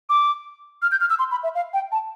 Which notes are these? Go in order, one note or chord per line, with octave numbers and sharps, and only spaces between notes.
D6
F6
G6
F6
E6
C6
B5
E5
F5
G5
A5